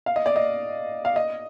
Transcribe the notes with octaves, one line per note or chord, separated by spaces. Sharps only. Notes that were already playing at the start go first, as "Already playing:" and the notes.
F5
D#5
D5
D#5
F5
D#5